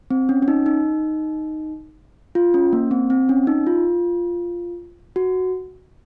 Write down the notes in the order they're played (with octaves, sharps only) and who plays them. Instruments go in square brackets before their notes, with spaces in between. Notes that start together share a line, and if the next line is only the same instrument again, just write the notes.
[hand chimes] C4
C#4
C#4
D#4
D#4
F4
C#4
A#3
C4
C4
C#4
D#4
F4
F#4